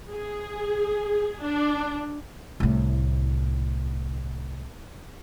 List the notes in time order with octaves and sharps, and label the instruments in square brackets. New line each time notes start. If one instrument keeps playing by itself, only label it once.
[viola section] G#4
D4
[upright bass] C2 A2